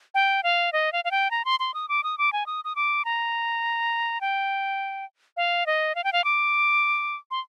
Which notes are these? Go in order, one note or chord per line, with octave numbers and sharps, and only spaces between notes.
G5
F5
D#5
F5
F5
G5
A#5
C6
C6
D#6
D6
D#6
D6
G#5
D#6
D#6
D6
A#5
G5
F5
D#5
F5
G5
F5
D6
C6